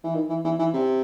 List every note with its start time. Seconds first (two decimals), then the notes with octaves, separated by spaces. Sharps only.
0.04 E3
0.15 D#3
0.29 E3
0.45 E3
0.59 E3
0.74 C3